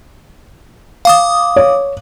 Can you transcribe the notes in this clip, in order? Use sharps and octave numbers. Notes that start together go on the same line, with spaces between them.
F5 D6 D#6
C#5